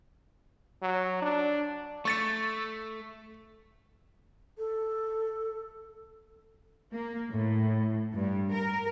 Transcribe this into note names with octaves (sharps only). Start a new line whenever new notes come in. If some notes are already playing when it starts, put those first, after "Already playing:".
F#3
D4
A3 C#6 A6 C#7
A4
A#3
A2
G2
A#4